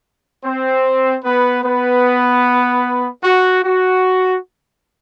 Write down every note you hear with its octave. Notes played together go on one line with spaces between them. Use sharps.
C4 C5
B3 B4
B3 B4
F#4
F#4